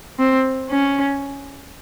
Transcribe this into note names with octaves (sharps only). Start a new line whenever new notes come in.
C4
C#4